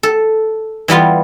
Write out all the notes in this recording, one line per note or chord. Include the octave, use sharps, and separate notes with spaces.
A4
E3 G3 B3 F4